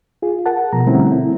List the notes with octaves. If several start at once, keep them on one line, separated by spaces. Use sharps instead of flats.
F4 G#4
A#4 F#5 A5
B2 F3 A#5
D3 G3 A3 C4 C#4 E4
C4 E4